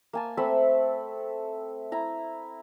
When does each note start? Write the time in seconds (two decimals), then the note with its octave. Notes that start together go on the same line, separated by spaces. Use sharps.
0.13 A#3 G#5 A5
0.37 A3 C4 E5 B5
1.92 E4 A#5